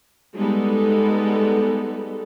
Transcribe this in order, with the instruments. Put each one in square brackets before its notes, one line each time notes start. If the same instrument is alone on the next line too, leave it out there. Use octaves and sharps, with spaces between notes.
[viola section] G3 G#3 B3 D#4 G4 A4